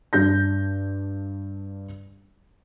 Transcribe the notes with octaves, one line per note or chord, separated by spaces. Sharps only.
G2 D4 G6 A#6